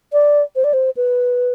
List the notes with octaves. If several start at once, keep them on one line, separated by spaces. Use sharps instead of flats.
D5
C5
D5
C5
B4